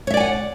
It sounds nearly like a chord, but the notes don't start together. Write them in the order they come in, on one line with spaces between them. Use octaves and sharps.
C#5 E5 D5 G#5 F#5